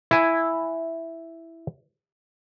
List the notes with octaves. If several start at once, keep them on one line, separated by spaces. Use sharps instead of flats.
E4 G#5